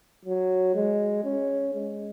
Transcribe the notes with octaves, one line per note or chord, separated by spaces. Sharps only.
F#3
G#3
C#4
G#3